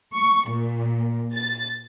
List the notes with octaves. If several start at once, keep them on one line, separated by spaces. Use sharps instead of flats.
C#6
A#2
A6